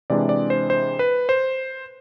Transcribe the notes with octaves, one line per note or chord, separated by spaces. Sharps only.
C3 E3 G#3 D4 D5
D5
C5
C5
B4
C5